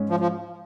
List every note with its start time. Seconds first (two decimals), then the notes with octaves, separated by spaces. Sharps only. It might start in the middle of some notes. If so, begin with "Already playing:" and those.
Already playing: G#2 G#3 C#4
0.10 F3
0.20 F3